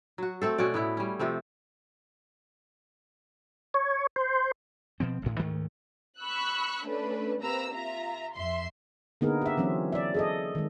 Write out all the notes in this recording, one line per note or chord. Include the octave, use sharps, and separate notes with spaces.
F#3 F#4
A3 C4 A4
B2 C#4 F#4 D5
A2 B3 E4
G3 C#4
C3 F3 A3 C4
C#5
C5
B2 F3 C4
A1 D2 A2
D2 G#2 D#3 A3
B5 C#6 E6 F#6
A3 C#4 D4 B4
C3 A#3 C4 B4 A#5 E6
F4 E5 A#5
F2 E5 C6
D3 A#3 B3 D#4 G#4 A#4
G4 E5
E3 F#3 C4 C#4
D5 E5
G#4 A4 D#5
D#3 G#3